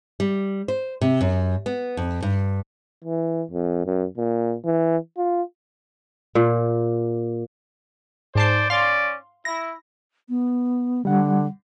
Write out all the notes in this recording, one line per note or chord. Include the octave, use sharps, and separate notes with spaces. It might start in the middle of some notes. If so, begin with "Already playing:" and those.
G3
C5
C3
F#2
B3
F2
G2
E3
F2
F#2
A#2
E3
F4
A#2
G#2 C5 D5 A5 C7
C#4 D5 F5 C6
E4 A#6
B3
D3 G3 F#5